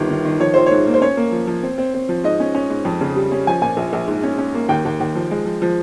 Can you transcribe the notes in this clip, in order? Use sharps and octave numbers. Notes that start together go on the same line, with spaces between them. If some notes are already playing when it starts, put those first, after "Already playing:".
Already playing: G1 G2 D#3
D#3
D#3
F3 C#5
A#1 C5
G#2 C#5
A#3
C5
C#4 C#5
A#3
F3
F3
C4
C4
C4
F3
G#2 D#5
C#4
C#4
G#2
F2
C#3
G3
C#4
F3 G#5
A#2 G#5
A#1
A#1
G#2
C#4
C#4
A#3
D#2 G5
D#2
D#2
F3
G#3
F3
F3